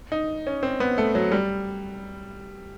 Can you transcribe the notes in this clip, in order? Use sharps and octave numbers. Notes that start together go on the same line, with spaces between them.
D#4
C#4
C4
B3
A3
F#3
G3